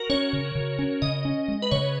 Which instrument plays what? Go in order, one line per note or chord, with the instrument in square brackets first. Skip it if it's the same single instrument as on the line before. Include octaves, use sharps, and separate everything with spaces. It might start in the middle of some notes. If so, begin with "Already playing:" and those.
Already playing: [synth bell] F#4 A#4
[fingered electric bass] C#4 [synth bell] C#5
[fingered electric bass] C#3
C#3
C#4
[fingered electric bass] C#3 [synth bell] D#5
[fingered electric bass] C#4
G#3
[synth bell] B4
[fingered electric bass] C#3 [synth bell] C#5